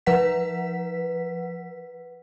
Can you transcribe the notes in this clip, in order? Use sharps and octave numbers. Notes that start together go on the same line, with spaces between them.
F3 B4 F#5 B6